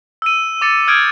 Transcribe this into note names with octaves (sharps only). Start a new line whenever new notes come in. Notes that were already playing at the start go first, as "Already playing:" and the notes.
E6 D#7
D6 A6 C#7
D#6 F6 G6 G#6 D7